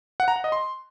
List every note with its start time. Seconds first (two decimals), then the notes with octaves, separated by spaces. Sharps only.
0.20 F#5
0.28 A#5
0.36 F#5
0.44 D#5
0.52 C6